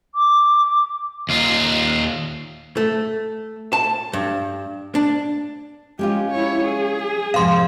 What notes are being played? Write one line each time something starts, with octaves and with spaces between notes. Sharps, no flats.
D6
D#2 F4
A3
A5
G2
D4
G#3 C#4 F4 G4
E4 C#5
G#4
F2 G#2 C3 F5 C6